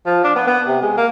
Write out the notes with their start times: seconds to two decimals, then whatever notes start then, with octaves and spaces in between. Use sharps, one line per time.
0.06 F3
0.24 D4
0.36 B3
0.47 B3
0.68 C3
0.82 G#3
0.97 A#3